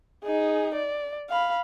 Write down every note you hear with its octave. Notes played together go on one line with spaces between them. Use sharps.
D#4 G#4
D5
F5 B5